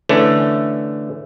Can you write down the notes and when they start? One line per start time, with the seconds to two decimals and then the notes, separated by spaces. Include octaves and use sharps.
0.09 D3 E3 A3 C#4